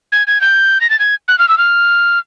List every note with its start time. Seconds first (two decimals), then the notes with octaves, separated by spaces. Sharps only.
0.12 G#6
0.27 G#6
0.41 G6
0.81 A#6
0.90 A6
0.99 G#6
1.28 F#6
1.39 F6
1.48 E6
1.58 F6